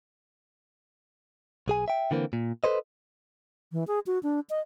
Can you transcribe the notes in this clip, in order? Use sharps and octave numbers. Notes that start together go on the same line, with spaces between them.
B1 G#4 G#5
E5 G5
D3 E3 A#3 C4
A#2
A4 B4 C5 D#5
E3
G#4
F#4
D4
D#5